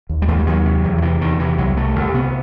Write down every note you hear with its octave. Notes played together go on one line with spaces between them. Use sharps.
D#2
G3
D#2 A3
G3
D#2 F#3
C3
E2
F#3
C3 E3
E2 D#3
C3 E3
C2 F#3
C3 A3
C2
C3 B3